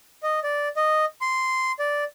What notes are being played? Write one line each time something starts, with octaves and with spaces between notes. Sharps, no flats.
D#5
D5
D#5
C6
D5